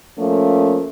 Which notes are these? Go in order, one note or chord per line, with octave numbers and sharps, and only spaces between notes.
F3 A3 A#3 C#4